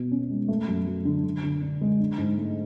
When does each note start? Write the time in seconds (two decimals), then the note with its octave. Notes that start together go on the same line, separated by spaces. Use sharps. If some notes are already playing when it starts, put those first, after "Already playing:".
Already playing: B2
0.11 C#4
0.30 G#3
0.48 A3
0.68 F#2
0.87 F#3
1.05 D3
1.24 D3
1.44 D3
1.62 D4
1.81 G#3
1.99 D4
2.18 G#2
2.38 A3